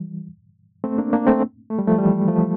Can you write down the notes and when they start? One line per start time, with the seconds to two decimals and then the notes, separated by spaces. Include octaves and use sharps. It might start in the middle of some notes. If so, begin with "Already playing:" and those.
Already playing: E3 G3
0.84 A3 C4
0.98 A#3 D4
1.13 A#3 D4
1.27 A3 C4
1.70 A3
1.79 G3
1.88 F3 A3
1.99 E3 G3
2.28 F3 A3